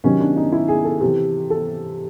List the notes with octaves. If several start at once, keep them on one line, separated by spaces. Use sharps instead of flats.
C3 D#3 F#3 C#4
D4
D#4
E4
G#4
A4
C3 E3
A4